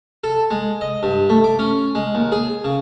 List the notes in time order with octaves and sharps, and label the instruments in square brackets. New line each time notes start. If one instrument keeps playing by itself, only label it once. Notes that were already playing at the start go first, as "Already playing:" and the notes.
[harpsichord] A4
G#3
D#5
G2
A3
D6
C#4
G#3
D#2
G#4
C#3